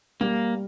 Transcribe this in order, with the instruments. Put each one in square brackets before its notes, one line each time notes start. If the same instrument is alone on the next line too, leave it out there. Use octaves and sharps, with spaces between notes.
[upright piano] G3 [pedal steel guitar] A#3